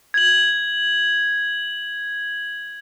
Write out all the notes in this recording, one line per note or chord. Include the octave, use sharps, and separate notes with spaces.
G#6 F#7